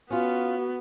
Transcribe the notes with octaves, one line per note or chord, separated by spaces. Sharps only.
B3 C#4 F4 F#4